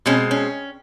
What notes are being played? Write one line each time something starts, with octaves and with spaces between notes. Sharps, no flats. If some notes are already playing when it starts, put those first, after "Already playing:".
B2 G#3 C4 C#4
C#4